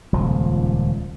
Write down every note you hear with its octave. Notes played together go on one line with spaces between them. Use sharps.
D#1 C#2 F3